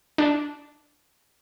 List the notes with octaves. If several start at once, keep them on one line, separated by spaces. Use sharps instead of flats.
D4